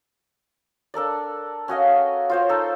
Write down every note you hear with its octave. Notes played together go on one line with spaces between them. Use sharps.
D4 A4 A#4 D5
C#4 F#4 D#5 F5
F4 C5 C#5
D#4 A4